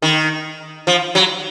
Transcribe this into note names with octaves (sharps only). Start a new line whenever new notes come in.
D#3
F3
F#3